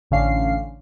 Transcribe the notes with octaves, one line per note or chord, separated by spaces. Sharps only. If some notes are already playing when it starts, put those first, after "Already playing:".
A1 D3 C#4 F5 C7